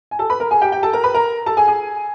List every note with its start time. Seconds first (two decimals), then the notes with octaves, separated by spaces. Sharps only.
0.11 G#5
0.19 A4 A5
0.30 B4 B5
0.40 A#4 A#5
0.51 G#4 G#5
0.61 G4 G5
0.72 G4 G5
0.83 A4 A5
0.93 A#4 A#5
1.04 B4 B5
1.14 A#4 A#5
1.46 A4 A5
1.57 G#4 G#5
1.68 G#4 G#5